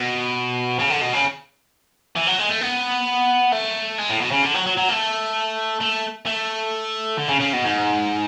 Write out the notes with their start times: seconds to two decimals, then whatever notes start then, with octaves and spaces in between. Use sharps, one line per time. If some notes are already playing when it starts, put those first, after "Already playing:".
Already playing: B2
0.79 C#3
0.90 D3
1.01 B2
1.13 C#3
2.16 E3
2.27 F#3
2.39 G#3
2.49 A3
2.61 B3
3.52 A3
3.98 G#3
4.10 A2
4.21 B2
4.32 C#3
4.43 D3
4.55 F#3
4.67 F#3
4.78 F#3
4.89 A3
5.81 A3
6.27 A3
7.18 D3
7.29 C#3
7.40 C#3
7.53 B2
7.64 G#2